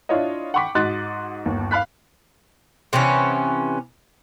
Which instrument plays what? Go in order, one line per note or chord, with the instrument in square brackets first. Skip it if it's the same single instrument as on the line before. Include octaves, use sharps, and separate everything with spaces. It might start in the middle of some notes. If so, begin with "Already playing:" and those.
[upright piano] D4 E4 F4 C#5 D#5
F#5 G5 B5 C#6 D6 B6
G#2 F#4 D#5 C6 F#6 A6
G1 D#2
F5 B5 F#6 B6
[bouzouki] C3 E3 B3 C#4